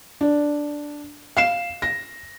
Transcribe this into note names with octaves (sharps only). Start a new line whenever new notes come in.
D4
F5 C7 E7
A#6